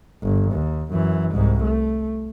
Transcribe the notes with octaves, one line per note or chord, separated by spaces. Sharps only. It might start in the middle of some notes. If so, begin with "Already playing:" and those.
G1
D#2
F#2 E3
C2 G#2
A3